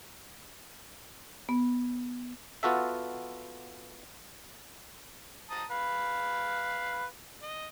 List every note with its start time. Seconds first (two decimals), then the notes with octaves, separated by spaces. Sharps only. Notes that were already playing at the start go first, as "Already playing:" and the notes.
1.49 B3
2.63 B3 F4 F#4 A4 E5
5.50 A5 A#5 D#6
5.70 B4 F5
7.43 D#5